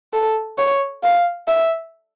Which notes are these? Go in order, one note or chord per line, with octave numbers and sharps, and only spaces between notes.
A4
C#5
F5
E5